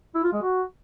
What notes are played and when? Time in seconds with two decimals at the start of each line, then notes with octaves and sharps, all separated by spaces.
0.15 E4
0.24 F4
0.33 G#3
0.42 F#4